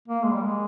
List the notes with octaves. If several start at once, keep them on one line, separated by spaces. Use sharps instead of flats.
A#3
G#3
G3
G#3